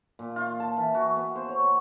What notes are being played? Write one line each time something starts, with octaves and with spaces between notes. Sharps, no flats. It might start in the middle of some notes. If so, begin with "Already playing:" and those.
A#2
F4
A5
E3
F#4
B3
C5
C#5
B3